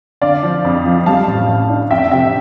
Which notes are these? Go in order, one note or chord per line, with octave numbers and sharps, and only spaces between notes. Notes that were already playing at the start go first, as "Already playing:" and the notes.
D3 D5 F5
F3
F2
F3
G3 F5 A5
A1
A1
D4
F2 E5 G5
C3 E5 G5